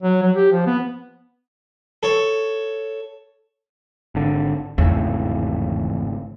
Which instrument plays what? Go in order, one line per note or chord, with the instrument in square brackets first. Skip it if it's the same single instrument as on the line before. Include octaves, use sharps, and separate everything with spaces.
[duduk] F#3
F#3
G4
F3
B3
[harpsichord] A4 C#5
[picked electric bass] G#1 D3
[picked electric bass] G#1 A2 C#3 [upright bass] E2